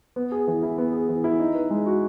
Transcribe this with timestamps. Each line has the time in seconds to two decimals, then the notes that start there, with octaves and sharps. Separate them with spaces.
0.16 B3
0.32 G#4
0.48 E3
0.63 E4
0.78 B3
0.93 G#4
1.09 E3
1.24 E4
1.40 D#4
1.55 B4
1.70 G#3
1.86 F#4